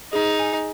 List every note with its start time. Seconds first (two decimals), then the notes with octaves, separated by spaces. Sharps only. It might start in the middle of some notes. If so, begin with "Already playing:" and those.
0.13 D#4 G#4
0.39 G#5